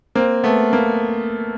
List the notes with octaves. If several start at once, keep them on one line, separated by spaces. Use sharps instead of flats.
A#3 C4
A3 B3
A#3